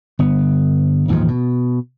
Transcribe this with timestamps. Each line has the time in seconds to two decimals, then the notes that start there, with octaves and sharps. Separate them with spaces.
0.19 G1 B3
1.08 A1 D#2 G#2 F3
1.28 B2